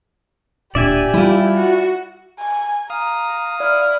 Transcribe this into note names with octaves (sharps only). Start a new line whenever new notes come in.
D1 A#2 D4 G4 D5 E5 G#5
G3 E4 F4
F#4
G#5
F5 A#5 D#6
E4 D5 F6